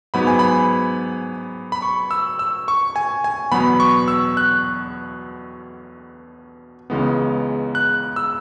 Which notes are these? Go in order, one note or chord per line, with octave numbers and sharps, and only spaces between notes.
G#2 F#3 B3 B5
G#5
B5
B5
C#6
E6
E6
C#6
G#5
G#5
E2 B2 F#3 B3 B5
C#6
E6
F#6
C#2 C#3 E3 G#3 B3
F#6
E6